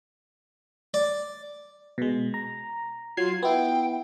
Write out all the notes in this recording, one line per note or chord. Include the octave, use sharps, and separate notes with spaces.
D5
B2 G#3
A#5
F#3 F4 G#6 C7
B3 E4 G5